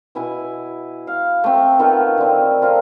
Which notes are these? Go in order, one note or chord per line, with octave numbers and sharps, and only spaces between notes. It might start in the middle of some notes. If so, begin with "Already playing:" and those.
B2 E4 G#5
F5
A3 C4
D#3 B3 F4 A4
D3 C4
F3 F4 A#4 C5